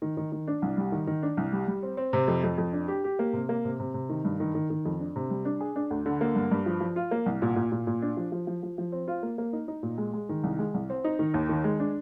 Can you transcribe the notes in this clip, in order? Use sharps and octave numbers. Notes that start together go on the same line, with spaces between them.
D#3
D#3
D#3
D4
C2
G3
D#3
D#3
D4
C2
G3
G3
C4
C4
C3
F2
F2
F2
D4
G4
G4
A#3
C3
A#3
C3
C3
C3
D#3
G2
D#3
D#3
D#3
F2
D4
C3
G3
D4
G#4
D4
D2
D3
A#3
G2
G2
F3
F3
F4
A#3
C2
A#2
A#2
A#2
A#2
D4
F3
F3
F3
F3
F3
C4
F4
A#3
A#3
D#4
D#4
A#2
G#3
G#3
D#3
C2
G#3
C2
C4
D#4
D#3
D#2
D#3
G#3
D4